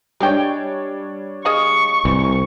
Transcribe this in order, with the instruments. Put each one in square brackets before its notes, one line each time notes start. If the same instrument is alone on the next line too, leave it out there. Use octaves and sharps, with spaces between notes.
[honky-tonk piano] G3 D4 C#5 [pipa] G#3 G4 G5
[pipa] G#4 D#5 F5 [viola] C#6
[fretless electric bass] C2 [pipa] E3